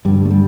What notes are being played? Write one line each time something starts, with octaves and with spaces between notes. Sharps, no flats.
G2 D3 G3
A3
G3